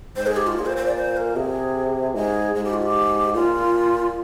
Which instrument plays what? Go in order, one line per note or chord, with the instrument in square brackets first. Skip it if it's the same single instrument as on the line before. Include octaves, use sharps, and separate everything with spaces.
[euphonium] G#2 [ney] C5
[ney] G#4
G4
F4
[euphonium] A#2 [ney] G#4
[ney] C5
C5
D5
C5
A#4
[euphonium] C3 [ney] G#4
[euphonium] G#2 [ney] G#4
[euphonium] G#2 [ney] G#4
[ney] G4
F4
G4
[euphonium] A#2 [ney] F4